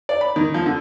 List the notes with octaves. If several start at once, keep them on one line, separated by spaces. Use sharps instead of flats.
D5
B5
D#3
F3
D3